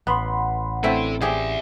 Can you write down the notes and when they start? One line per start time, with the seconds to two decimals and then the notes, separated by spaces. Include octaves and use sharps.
0.07 A1 B3 F#5 B5 C6
0.84 A3 C4 E4 A4 D5
1.21 C4 G4 G#4 D5 E5